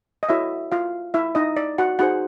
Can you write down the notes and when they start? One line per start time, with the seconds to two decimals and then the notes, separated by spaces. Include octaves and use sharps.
0.23 D#5
0.29 E4 F#4 A4 C#5 E5
0.72 F4 F5
1.14 E4 E5
1.35 D#4 D#5
1.57 D5
1.78 F#4 F#5
1.99 D#4 F#4 G#4 C5 F#5